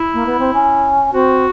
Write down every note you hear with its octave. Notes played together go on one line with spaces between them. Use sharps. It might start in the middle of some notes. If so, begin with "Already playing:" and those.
Already playing: E4
A#3
B3
C4
C#4
C4 F#4